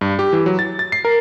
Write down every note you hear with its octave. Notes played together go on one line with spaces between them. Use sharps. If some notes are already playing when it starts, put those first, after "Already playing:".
G2
G4
E3
F#3
A6
A6
C7
A#4